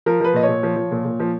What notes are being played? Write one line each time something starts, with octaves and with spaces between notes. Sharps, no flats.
F3 A#4
F3 B4
A#2 D#5
C#5
A#2
F3
F3
A#2
A#2
F3